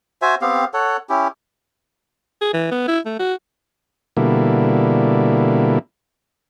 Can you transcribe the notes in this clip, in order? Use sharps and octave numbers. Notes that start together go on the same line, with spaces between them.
F#4 C5 E5 G#5
B3 C4 G4 F5
A4 C#5 F#5
C#4 E4 G4
G#4
E3
B3
E4
A3
F#4
B2 D3 G3 A#3 E4